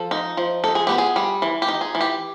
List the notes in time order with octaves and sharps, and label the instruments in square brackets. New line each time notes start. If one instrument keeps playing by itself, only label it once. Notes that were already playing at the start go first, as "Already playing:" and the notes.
Already playing: [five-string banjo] F3 A4
D#4
F3
D#4 A4
G#4
B3 G4
G#4
G3
E3
G4
D#4
G#4
E3
G4